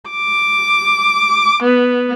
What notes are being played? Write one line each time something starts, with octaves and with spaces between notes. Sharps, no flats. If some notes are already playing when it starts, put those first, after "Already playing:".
D6
B3